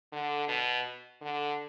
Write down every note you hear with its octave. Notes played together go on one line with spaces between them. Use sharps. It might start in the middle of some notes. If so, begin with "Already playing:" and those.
D3
B2
D3